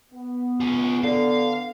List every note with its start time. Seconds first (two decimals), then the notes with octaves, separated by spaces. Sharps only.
0.12 B3
0.60 F4 G#4
1.04 D3 F5